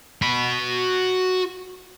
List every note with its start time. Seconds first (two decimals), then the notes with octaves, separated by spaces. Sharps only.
0.22 F#4 B5